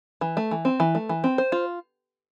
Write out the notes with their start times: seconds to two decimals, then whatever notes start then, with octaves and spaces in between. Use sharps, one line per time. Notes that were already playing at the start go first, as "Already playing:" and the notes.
0.21 E3
0.37 A3
0.51 E3
0.65 C4
0.80 E3
0.95 A3
1.09 E3
1.24 C4
1.38 C5
1.52 F4